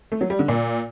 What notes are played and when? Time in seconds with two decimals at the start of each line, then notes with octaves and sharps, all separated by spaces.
0.12 A3
0.21 F#3
0.30 G3
0.39 D3
0.48 A#2